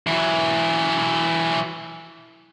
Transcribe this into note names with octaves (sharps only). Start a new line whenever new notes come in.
E3 F#3